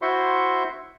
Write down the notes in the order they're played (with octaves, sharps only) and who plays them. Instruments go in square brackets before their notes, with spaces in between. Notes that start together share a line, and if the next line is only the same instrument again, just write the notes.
[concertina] E4 F#4 C5 E5 C6 C#6